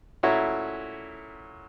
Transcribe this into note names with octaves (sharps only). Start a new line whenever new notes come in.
A#2 A3 C#4 E4 F#4 C#5